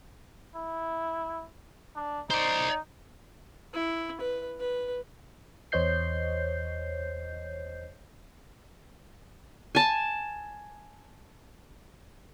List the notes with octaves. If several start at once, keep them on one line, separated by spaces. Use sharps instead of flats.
E4
D4
D#4 C5 D5
E4
B4
B4
E2 C5 C#5 D#5 G6 C7
G#5 A5